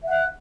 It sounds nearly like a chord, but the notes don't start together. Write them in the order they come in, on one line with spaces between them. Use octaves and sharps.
E5 F#5 F#6